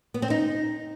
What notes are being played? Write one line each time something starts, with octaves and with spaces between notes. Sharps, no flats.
B3
C4
D#4